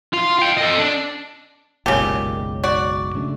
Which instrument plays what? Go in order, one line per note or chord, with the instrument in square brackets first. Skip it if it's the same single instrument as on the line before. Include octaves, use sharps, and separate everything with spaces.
[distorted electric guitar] F4
F5 G5
A4 D#5
D4
[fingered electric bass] F#1 B1 G#3 [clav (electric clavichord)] A#2 A5 [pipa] C#3 G4
[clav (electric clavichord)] F#4 [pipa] D5
[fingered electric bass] C#3 A3 D4